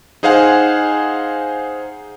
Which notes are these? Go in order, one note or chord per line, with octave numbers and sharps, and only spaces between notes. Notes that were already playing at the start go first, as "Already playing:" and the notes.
D#4 G#4 C5 F5 F#5 G#5